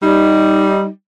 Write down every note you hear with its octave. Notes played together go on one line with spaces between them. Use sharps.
G3 D#4